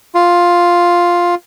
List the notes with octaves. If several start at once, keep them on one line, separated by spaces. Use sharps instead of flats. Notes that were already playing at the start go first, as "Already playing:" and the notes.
F4